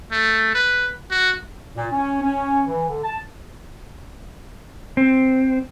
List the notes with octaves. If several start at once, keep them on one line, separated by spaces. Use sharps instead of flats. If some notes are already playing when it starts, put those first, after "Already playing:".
A3
B4
F#4
A#2
C#4
C#4
E3
D3
A5
C4